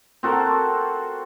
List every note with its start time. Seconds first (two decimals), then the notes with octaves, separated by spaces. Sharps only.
0.23 C4 F#4 A4 A#4